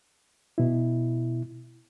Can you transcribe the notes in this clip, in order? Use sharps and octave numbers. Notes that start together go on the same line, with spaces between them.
B2 E4